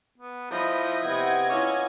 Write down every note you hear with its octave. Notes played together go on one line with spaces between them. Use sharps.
B3
F3 E4 D#5 B5 D#6 G6
C3 B3 D#5 G#6
C#4 E4 F4 D5 C#6 E6